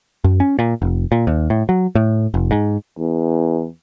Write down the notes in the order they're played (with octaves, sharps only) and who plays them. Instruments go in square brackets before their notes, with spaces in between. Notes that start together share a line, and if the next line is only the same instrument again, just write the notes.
[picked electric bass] F#2
C#4
A#2
F1
A#2
D#2
A2
F#3
A2
F1
G#2
[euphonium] E2